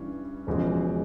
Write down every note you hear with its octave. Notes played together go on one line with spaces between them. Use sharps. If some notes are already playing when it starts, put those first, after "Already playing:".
Already playing: G2 E3 C#4
E1 E2 C#3 F3 G#3